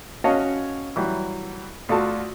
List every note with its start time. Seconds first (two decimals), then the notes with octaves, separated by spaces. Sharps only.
0.24 C#4 F#4 C#5 D#5 F5 A5
0.96 E3 F#3 G3
1.89 D2 F4 F#4 A4 A5